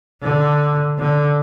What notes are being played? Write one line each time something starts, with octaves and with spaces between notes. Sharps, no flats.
D3
D3